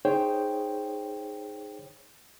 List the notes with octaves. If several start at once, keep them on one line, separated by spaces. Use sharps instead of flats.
D#4 G#4 C5 C#5 G5